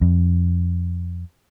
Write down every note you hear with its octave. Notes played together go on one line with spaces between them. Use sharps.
F2